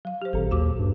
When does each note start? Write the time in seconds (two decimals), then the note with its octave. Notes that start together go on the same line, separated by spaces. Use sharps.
0.05 F#3 F5
0.22 G4 C5
0.33 G#1 A#2 A4
0.51 D#2 F#4 D6
0.79 G2